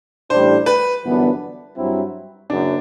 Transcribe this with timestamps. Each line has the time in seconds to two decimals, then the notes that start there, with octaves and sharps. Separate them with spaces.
0.30 A1 A2 G3 D4 C5
0.66 B4
1.03 G1 F#2 E3 B3 D4
1.77 G2 F#3 C4 E4
2.49 F#1 F#2 D4